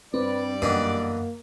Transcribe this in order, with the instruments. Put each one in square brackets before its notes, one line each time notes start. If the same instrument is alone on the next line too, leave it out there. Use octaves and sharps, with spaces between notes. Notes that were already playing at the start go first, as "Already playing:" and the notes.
[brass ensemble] G2 G3 D5 [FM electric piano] C4 [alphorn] B4
[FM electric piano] F#2 [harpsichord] B2 D3 E3 [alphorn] A#3